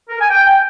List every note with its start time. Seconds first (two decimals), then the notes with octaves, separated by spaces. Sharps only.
0.09 A#4
0.20 G#5
0.30 G5